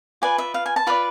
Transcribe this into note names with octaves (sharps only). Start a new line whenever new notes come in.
F4 B4 D5 G#5
E5
F5
G#5
A5
F4 B4 D5 B5